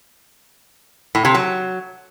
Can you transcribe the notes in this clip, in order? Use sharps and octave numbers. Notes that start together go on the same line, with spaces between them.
A2
C3
F#3